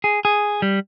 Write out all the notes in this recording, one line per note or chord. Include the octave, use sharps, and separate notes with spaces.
G#4
G#4
G3